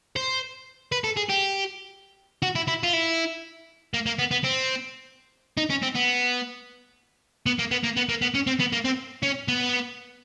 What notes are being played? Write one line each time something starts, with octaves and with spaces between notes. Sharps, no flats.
C5
B4
A4
G#4
G4
F#4
E4
E4
F4
E4
A#3
A#3
B3
B3
C4
D#4
C#4
C4
B3
B3
A#3
B3
A#3
B3
A#3
B3
C#4
C4
B3
A#3
C4
C#4
B3